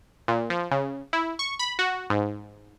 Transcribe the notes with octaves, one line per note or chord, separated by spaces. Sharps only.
A#2
F3
C#3
E4
C#6
B5
F#4
G#2